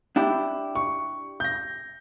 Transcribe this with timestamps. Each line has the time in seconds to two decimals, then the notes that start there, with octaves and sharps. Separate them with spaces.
0.16 D4 E4 G4
0.75 C#6
1.40 G6 A#6